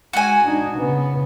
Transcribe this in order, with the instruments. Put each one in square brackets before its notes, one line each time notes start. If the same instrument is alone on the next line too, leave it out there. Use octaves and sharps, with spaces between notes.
[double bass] G#3 [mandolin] F#4 G#5
[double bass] D4 D#4
C#3 B3